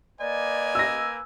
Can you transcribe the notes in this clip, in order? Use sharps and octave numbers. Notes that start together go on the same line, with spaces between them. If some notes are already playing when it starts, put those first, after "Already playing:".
A#3 B4 D5 D#5 G#5
E6 A#6